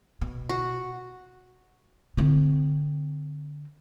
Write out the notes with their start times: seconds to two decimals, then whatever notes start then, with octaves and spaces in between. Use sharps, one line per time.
0.21 B2
0.49 F#4
2.17 D3 C4